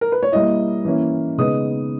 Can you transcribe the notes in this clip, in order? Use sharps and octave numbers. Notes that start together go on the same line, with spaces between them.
A#4
B4
C#5
G3 A#3 E4 D#5
E3 A#3 C#4 E4
C#3 G#3 B3 D#4 D#6